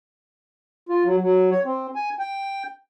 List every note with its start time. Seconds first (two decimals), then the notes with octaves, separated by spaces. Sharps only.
0.89 F4
1.05 F#3
1.21 F#3
1.51 C#5
1.65 C4
1.95 G#5
2.19 G5